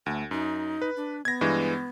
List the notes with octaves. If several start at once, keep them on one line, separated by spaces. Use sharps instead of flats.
D2 A3
F#2 D#4
B4
D4
B3 G#6 A#6
G2 E3 G#3